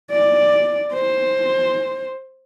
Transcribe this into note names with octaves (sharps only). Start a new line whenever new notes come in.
D5
C5